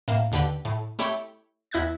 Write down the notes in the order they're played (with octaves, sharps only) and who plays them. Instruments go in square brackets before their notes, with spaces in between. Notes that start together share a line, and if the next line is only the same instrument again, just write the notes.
[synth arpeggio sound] A2 A#3 E7
D#2 D3 G4 B4 G6
A2
A3 E4 G4 C#5 G5
E2 E4 D#5 F#6 G#6 A6